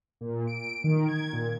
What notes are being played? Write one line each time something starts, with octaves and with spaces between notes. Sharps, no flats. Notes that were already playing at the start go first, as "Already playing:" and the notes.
A#2
D7
D#3
G#6
A#2